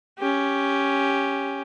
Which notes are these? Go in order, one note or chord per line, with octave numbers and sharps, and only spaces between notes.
C#4 G4